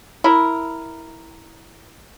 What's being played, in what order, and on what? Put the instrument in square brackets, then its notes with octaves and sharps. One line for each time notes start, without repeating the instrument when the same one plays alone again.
[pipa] E4 A#4